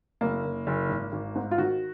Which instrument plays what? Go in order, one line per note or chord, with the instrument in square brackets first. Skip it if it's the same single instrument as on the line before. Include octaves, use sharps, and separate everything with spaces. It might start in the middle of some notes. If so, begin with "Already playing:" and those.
[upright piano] F#1 A#3
F#1
F#1
G#1
G#1
G#2
F4
D#3 F#4